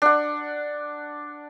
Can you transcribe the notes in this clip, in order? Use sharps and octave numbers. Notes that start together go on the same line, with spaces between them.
D4 F#5